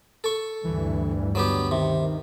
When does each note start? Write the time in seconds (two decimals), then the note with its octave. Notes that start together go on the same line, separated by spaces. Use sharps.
0.24 A4 C#6
0.65 D2 G2 E3
1.35 F#3 B3 G4
1.71 C3 D#3